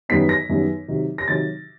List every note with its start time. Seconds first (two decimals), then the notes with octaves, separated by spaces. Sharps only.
0.09 F#2 D#3 G3 B3 D#4 B6
0.29 A#6
0.49 F#2 D#3 G3 B3 D#4
0.88 C3 D#3 F#3
1.18 A#6
1.28 C3 D#3 F#3 A6